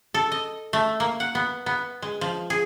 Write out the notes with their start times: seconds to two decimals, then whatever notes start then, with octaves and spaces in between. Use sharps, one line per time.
0.14 A4
0.32 D#5
0.73 A3
1.00 A#3
1.20 F#5
1.35 B3
1.66 B3
2.02 G#3
2.21 F3
2.50 G#4